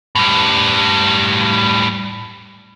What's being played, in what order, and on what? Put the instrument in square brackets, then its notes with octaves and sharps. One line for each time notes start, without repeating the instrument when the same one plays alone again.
[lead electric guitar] A2 G3